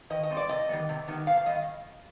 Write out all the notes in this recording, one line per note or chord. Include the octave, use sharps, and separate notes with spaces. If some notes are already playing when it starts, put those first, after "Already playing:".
D#3 D#5
D#5
G3 C4
D5
C3 D#5
D#3 G3 B3
C3
D#3 G3 B3
C3 F5
F5
D#3 G3 B3 D#5